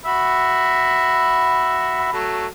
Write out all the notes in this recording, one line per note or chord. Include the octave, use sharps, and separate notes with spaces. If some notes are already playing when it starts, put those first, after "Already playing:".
F#4 E5 B5
F#3 A3